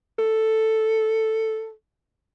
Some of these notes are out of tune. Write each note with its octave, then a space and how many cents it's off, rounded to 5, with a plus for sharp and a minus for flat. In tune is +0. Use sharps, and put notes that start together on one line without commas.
A4 +5